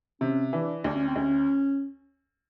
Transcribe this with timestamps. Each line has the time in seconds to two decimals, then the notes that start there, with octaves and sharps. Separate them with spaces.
0.21 C3 C#4
0.53 E3 D4
0.84 D2 D4
0.95 C#4
1.06 C4
1.16 D2 C#4